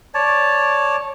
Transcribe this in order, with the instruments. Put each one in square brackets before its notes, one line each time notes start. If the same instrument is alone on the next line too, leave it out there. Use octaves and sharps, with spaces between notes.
[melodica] C#5 D5 A5